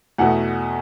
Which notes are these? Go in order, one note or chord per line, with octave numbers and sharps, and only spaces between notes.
E2 B2 A3 F#5